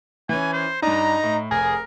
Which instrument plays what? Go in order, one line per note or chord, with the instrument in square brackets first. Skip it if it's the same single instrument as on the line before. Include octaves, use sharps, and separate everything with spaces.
[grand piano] E3 C#4 [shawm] G#5
[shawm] C5
[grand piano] G2 D4 [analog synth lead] D#4 [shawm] A#5
[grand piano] A2
[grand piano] F1 [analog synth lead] G#4 [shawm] A#4